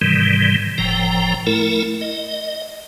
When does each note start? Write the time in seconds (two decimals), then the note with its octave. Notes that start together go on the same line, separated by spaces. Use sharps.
0.01 G#2 C3 D#3 E3 G3
0.78 F#1 A2 F3 G5 A#5
1.47 A3 E4 A#4
2.01 D#5